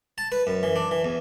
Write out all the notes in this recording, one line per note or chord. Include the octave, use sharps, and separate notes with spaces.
A5
B4
F#2
E3
D4
E3
E2